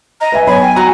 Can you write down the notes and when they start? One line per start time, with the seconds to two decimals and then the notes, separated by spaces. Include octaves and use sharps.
0.21 D#5 A#5
0.32 B4 E5 G#5
0.47 B1 C#5 G#5 B5
0.62 G5
0.76 F#4 A#5